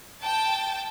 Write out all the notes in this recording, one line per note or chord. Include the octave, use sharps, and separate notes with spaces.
G5 A5